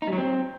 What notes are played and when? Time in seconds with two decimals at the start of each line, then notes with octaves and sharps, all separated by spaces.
0.02 D#4
0.07 G3
0.13 F#3
0.18 C4